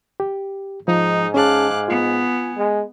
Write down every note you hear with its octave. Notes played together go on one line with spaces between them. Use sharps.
G4
G#2 F3 D#4
C#4 G#4 F5 G#5 A5 D6 F#6
B3 F4
G#3